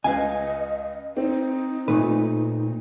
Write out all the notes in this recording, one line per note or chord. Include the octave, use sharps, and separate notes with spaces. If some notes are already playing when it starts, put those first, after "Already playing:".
C#2 B4 D#5 F5 G#5
C4 D#4
A#2 A3 B4